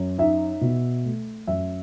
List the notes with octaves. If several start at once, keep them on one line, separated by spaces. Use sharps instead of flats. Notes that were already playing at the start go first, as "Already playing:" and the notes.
Already playing: F#2
D#4 E5
B2
A3
F#2 E5